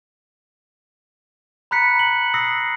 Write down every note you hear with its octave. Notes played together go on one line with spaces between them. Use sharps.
A#5 B5 F#6 B6 C#7
F#7
D#6 E6 A#6 C7